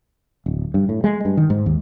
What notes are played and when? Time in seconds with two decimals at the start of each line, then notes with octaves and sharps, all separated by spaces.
0.46 D1
0.74 G2
0.89 A2
1.04 G#3
1.25 G2
1.37 D#3
1.50 G#2
1.66 D#2